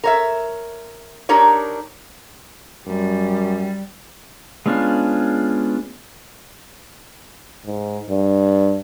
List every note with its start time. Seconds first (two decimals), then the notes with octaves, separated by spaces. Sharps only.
0.04 A#4 C#5 E5
1.29 D4 D#4 G4 A#4 C#5
2.87 F#2 G3
4.66 G#3 B3 C#4 D4 F4
7.66 G#2
8.10 G2